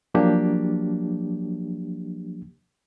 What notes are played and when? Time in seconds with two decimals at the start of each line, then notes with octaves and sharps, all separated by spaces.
0.14 F3 F#3 A#3 D4 G4